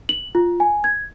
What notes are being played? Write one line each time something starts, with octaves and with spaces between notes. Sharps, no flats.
F#7
F4
G#5
G#6